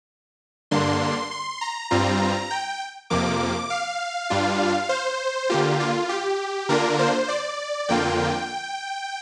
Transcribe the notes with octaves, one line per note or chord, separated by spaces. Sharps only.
G2 D3 A#3 D4 C6
C6
A#5
G2 G3 C4 F4 A#5
G5
F2 C3 F3 A#3 D6
F5
G2 G3 D4 F4
C5
D3 A#3 F4 G4
F4
G4
D3 A#3 D4 F4 A#4
C5
D5
F2 D3 A#3 F4 G5